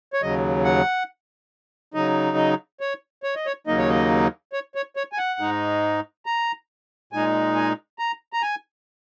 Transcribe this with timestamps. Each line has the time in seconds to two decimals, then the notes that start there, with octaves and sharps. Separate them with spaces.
0.13 C#5
0.22 D#2 C#3 F#3 D#5
0.64 F#5
1.94 C#3 F#3 D#4 D#5
2.37 D#5
2.81 C#5
3.23 C#5
3.35 D#5
3.46 C#5
3.67 D#2 C#3 F#3 A#3 D#4 D#5
3.78 C#5
3.89 D#5
4.53 C#5
4.75 C#5
4.96 C#5
5.12 G#5
5.18 F#5
5.40 G#2 G#3 D#4
6.26 A#5
7.12 A#2 G#3 D#4 G#5
7.56 G#5
7.99 A#5
8.33 A#5
8.42 G#5